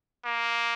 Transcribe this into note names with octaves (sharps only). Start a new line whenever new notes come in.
A#3